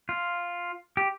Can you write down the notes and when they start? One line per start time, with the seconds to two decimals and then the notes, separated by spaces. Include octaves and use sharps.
0.09 F4
0.97 G4